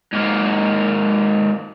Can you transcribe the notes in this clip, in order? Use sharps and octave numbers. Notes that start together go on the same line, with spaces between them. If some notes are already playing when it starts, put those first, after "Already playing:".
G#2 A#3